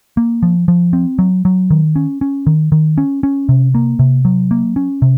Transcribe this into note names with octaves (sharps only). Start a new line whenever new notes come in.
A#3
F3
F3
C4
F#3
F#3
D#3
C#4
C#4
D#3
D#3
C#4
C#4
C3
A#3
C3
F#3
A#3
C#4
C3